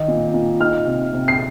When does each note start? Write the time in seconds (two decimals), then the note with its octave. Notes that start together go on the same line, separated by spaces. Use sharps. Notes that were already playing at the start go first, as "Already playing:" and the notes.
Already playing: D#3 D#4
0.08 A#2
0.34 A#2
0.60 D#4 F6
0.86 C3
1.13 C3
1.28 C7